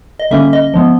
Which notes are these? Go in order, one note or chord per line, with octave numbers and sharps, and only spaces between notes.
D#5
D3 G3 A#3 C#4 E5
D#5
F3 G#3 B3